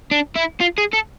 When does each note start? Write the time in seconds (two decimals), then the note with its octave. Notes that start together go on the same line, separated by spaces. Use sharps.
0.11 D4
0.35 E4
0.60 F4
0.78 G#4
0.93 A4